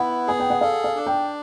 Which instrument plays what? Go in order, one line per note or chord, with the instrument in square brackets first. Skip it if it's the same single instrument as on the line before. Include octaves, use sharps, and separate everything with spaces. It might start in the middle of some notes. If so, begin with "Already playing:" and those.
Already playing: [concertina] B3 E4 [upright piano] F#5
[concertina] G#4 [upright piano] G#5
[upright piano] G5
F#5
[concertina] A4 [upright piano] F5
[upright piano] F5
[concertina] D4
[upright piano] G5